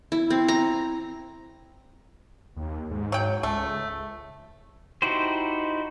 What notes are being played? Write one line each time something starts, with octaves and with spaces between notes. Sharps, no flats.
E4
C4
A#5
D#2
G#2
F#3 G5
C#2 A3
D#4 E4 F#4 G4 C5